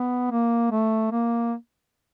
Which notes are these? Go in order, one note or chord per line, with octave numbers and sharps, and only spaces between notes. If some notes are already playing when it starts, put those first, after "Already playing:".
Already playing: B3
A#3
A3
A#3